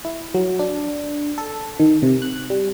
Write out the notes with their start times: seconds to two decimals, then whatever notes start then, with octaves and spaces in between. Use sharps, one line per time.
0.05 E4
0.34 F#3
0.59 D4
1.38 A4
1.80 D#3
2.03 C3
2.22 F#6
2.50 G3